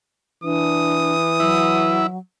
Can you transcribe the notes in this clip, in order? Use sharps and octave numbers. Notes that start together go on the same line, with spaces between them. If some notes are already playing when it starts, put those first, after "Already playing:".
E3 D4 D#6
F#3 E4